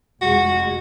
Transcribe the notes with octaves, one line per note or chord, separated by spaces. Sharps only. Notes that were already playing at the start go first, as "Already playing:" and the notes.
F1 G#3 F#4